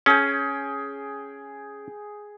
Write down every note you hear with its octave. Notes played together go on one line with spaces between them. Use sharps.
C#4 G#4 G5